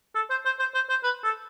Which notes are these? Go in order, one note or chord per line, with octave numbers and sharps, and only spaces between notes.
A4
C5
C5
C5
C5
C5
B4
A4